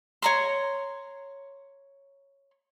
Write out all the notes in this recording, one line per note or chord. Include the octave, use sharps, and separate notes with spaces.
C#5 A#5 C6